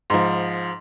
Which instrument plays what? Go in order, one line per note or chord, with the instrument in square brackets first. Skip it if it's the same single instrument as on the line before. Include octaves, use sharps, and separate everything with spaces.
[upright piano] G#2 F3